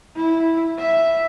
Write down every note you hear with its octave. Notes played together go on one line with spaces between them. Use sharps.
E4
E5